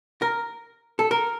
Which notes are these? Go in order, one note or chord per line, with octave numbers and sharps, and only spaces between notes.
A#4
A4
A#4